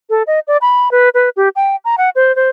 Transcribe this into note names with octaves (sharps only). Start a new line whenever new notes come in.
A4
D#5
D5
B5
B4
B4
G4
G5
A#5
F#5
C5
C5